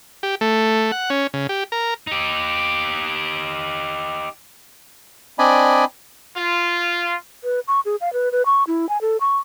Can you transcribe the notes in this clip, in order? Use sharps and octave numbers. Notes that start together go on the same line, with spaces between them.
G4
A3
F#5
C#4
C#3
G4
A#4
D#4 G4
C4 D4 D5 D#5 G#5 B5
F4
B4
C#6
G#4
F5
B4
B4
C#6
E4
G#5
A4
C#6